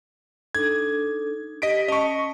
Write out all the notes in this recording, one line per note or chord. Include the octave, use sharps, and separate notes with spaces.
D4 D#4 A4 G#6
G4 D#5 B6 D7
C#4 D#5 A5 C#6